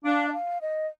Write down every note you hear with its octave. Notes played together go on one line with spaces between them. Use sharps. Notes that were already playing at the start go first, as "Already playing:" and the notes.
D4 F5
D#5
F5
D#5